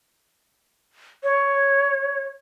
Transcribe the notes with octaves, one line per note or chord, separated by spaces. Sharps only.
C#5